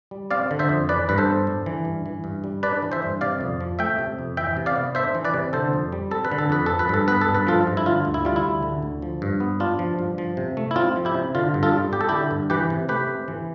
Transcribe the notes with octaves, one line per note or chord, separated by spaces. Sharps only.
G3
C4 D5 F5
D3
C5 E5
F2
E3 B4 D5
G2 B4
A4 C5
B3
D4
E3
G2
E3
G2
G3
D4 B4 D5
E3
C5 E5
G2
C3 D5 F5
F2
F3
A3 E5 G5
C3
F2
E3 E5 G5
C3
D5 F5
B3
D4 C5 E5
E3
B4 D5
C3
D3 A4 C5
F2
G3
C4 A4
B4
D3
A4
F2 B4
F3 A4
B4
G2 A4
B3 B4
A4
G2
B4
F3 F4 A4
G2
E4
D3 F4
D2
E4
G3 F4
E4
D2
D3
D2
F3
G2
B3
D4 F4
F3
G2
F3
C3
A3
E4
C4 F4
F3
E4 G4
C3
D3 F4
G2
F4 A4
G3
B3 G4
A4
D3 E4 G4
G2
E3 G4 B4
C3
A3 G4 B4
C4
E3